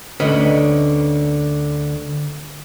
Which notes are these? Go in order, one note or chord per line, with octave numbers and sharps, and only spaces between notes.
D2 D3 C#4 B4 D#5